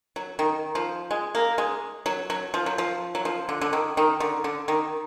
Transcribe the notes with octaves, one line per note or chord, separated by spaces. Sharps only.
F#3
D#3
F3
G#3
A#3
G#3
F#3
F#3
F3
F#3
F3
F#3
F3
D3
D3
D#3
D#3
D3
D3
D#3